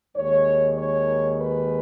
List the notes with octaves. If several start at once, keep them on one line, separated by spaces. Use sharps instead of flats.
D#2 D#3 G#3 C#5
C#5
B4